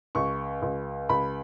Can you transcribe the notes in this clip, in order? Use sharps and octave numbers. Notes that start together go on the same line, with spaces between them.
C#2 C#6
C#2
C#2 B5